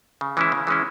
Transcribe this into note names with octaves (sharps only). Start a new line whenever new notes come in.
C#3
E3 G#3 C#4 E4
C#3
E3 G#3 C#4 E4